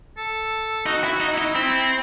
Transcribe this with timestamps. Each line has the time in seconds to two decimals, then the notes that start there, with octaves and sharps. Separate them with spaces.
0.18 A4
0.86 D#4 F#4
1.04 E4
1.09 F#4
1.21 D#4
1.33 E4
1.38 D#4
1.55 C4 E4